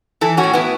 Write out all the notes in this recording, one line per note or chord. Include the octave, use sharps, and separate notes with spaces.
E3 E4 A4
C#4 F#4
A2
B3 E4